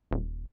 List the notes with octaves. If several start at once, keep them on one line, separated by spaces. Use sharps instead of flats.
D#1